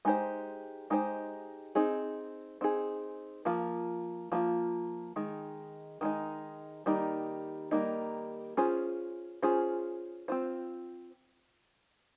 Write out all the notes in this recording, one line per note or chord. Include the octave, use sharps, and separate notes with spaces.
G#3 D#4 G4 C5
G#3 D#4 G4 C5
C4 D#4 G#4
C4 D#4 G#4
F3 A#3 F4
F3 A#3 F4
D#3 G#3 D#4
D#3 G#3 D#4
D#3 G3 A#3 D#4
D#3 G3 A#3 D#4
C#4 F4 G#4 C5
C#4 F4 G#4 C5
C4 F4 C5